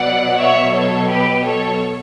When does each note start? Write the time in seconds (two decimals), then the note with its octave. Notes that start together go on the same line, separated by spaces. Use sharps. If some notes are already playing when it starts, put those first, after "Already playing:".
Already playing: B2 F#3 D5 F#5
0.37 C#5 E5
0.73 A4 C#5
1.09 G4 B4
1.44 A4 C#5